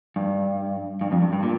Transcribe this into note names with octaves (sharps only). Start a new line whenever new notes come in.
G2
G2
F2
G2
G2
A#2